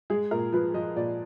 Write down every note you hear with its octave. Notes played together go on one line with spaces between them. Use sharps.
G#3 G#4
A#2 A#4
F3 B4
F3 D#5
A#2 D5